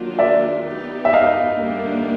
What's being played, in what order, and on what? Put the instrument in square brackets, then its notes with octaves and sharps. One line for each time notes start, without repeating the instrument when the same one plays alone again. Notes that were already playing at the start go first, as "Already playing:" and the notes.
Already playing: [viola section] D#3 F#3 A#3 D4 F4
[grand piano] D5 E5
[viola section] B3 D#4 G4
[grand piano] E5
D#5 F5
[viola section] D3 G3 A#3 D4